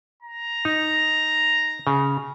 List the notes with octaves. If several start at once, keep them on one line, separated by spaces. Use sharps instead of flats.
A#5
D#4
C#3